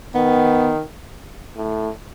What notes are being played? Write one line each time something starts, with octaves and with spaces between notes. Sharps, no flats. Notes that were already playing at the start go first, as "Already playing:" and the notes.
D#3 B3
A2